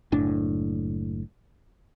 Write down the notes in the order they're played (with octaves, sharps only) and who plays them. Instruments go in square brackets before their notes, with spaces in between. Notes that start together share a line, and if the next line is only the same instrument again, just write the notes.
[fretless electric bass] F#1 A2 D4